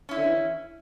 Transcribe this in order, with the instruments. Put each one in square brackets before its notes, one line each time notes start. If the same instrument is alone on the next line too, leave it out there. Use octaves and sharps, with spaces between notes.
[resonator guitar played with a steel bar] C#4 E4
[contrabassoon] D3
E3